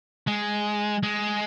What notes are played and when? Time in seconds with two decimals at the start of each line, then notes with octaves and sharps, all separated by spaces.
0.27 G#3
1.03 G#3